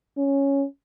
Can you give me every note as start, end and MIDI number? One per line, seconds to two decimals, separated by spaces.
0.17 0.65 61